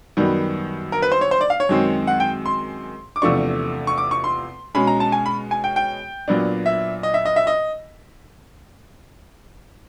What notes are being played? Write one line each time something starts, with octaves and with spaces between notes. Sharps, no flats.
F#2 D#3 G3 B3
A#4
B4
C5
C#5
C5
D5
F5
C#5
F#2 D#3 G#3 C4
F#5
G5
C6
D6
E2 C3 F3 A3 D4 C#6
C#6
D6
C#6
C6
B2 G#3 C#4 B5
A#5
A5
G#5
B5
G#5
G5
G5
A#2 F#3 B3 D4
E5
D#5
E5
D#5
E5
D#5